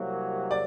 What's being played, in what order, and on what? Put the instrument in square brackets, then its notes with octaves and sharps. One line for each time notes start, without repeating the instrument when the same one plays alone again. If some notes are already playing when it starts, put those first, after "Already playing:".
Already playing: [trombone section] C2 C3 F#3 A#3 F#4
[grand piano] D5